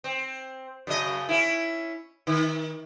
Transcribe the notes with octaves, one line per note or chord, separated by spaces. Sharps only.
C4
F#2 C#3 D#5
C#4 E4
D#3